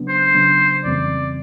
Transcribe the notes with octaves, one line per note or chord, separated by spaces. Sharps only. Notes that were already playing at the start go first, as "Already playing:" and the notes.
Already playing: C#3 F#3 B3 D4
C5
C#3 F#3 B3 D4
F2 C#3 E3 G3 C4 D5